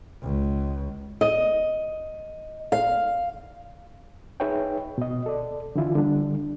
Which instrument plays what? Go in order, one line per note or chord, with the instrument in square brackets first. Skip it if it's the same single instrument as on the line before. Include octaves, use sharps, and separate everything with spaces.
[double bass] C#2
[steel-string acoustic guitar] D#5
F5
[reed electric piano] D#4 G#4 B4 C#5 E5 G5
B2 D#5
A4 D5
D3 E3 E4 F4
D3 G3 D4